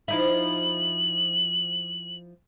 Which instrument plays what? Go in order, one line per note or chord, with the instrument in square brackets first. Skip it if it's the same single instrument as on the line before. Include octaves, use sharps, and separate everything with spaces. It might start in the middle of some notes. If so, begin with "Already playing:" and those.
[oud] F3 D#4 E4 [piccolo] F#7